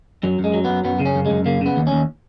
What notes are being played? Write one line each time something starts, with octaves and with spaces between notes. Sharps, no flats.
F#2 F#3
F#2 G#3
F#3
F#2 B3
F#2 B3
C#3
C#4
F#2
F#2 G#3
C#3 A#3
C#3 B3
D#2
D#2 C#4